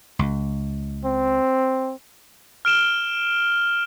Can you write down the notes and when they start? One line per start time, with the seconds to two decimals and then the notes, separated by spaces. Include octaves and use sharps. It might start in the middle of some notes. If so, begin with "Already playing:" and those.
0.19 C#2
1.05 C4
2.65 F6 D7 E7 G7